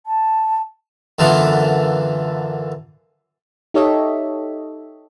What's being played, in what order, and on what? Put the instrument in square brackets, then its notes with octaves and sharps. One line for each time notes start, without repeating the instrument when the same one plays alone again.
[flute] A5
[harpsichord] F#2 D3 E3 B3 F4
[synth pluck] D#4 G4 A4 C#5 D#5 E5